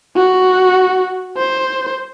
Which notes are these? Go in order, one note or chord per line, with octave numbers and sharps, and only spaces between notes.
F#4
C5